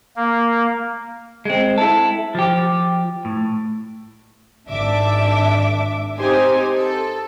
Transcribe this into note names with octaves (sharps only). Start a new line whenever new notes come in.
A#3
G#3 C4
E4 A4
F3 G4
A2
G#1 D4 E5 D6
C4 D#4 G4 C5 G#5
A4